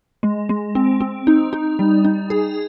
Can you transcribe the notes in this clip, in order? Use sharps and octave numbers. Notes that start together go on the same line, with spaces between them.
G#3
G#3
C4
C4
D#4
D#4
G3
D#4
G#4